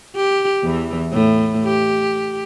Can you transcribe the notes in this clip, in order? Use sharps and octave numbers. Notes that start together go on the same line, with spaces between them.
G4
E2 E3
A2
G4